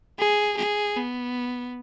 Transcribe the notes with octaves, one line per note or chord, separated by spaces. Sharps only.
G#4
G#4
B3